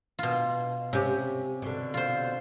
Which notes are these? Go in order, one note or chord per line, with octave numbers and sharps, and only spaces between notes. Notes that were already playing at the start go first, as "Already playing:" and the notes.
B2 F4
C3 C#4 G4
B2 D3
F4 C5